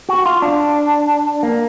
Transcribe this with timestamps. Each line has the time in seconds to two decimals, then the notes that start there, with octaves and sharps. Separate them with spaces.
0.09 F#4
0.26 F4
0.42 D4
1.43 A#3